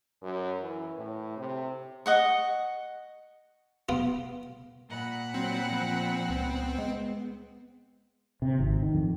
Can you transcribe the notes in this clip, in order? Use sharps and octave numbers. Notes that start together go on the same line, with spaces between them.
F#2
E3
A2
C3
D#5 F#5 C#6
B3 F4
A#2 F#5 B5
F#3 C4
F3
C#2 B3
G#3
C3
G#1
D#3
F2